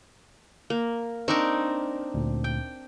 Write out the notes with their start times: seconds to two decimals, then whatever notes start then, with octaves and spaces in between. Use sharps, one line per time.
0.70 A#3
1.28 C4 D4 D#4 A#4 C#6
2.14 D2 A#2
2.44 G5